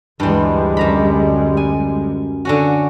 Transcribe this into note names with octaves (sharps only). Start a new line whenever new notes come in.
D2 G2 E3 G3 G#3
F#2 A#5 B5
G#5
D3 C#4 F#4